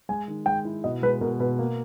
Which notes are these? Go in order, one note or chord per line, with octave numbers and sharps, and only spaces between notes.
G#3 G#5
D#3
G#3 G5
E4
B2 D#5
G#3 B4
B2 A#4
B2 B4
A#3